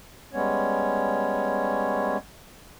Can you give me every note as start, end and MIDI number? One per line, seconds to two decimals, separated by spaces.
0.33 2.17 55
0.33 2.17 56
0.33 2.17 59
0.33 2.17 61
0.33 2.17 73